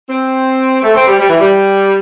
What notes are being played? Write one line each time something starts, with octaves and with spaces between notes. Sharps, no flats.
C4
A3
C4
G3
G3
E3
G3